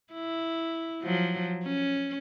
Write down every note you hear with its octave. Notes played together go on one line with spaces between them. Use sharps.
E4
F3 F#3
C#4